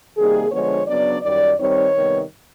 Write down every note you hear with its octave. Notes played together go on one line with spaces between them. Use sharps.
C3 D#3 G3 A#3 D#4 G#4
D3 F3 G#3 B3 D4 C#5
C#3 F#3 B3 D4 D5
F#2 D#3 G3 D5
D#3 G3 C4 D#4 C#5
C3 D#3 G3 B3